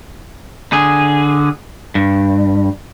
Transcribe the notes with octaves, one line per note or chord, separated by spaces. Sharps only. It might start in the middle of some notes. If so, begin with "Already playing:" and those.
D3 G#4
G2